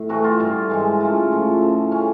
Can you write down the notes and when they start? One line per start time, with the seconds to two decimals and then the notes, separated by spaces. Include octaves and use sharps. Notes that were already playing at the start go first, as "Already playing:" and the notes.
Already playing: A2
0.09 C3 E3 A3 F#4
0.24 F4
0.39 G2 D3 G3
0.70 G#2 E3 G#3
1.01 C#3 F#3 A3 F4
1.32 A2 F3 A3
1.62 C#3 F3 A3
1.92 D3 G3 C#4